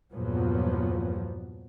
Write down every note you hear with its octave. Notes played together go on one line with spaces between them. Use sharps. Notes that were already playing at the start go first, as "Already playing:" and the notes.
E2 G2 A#2 F3 F#3 B3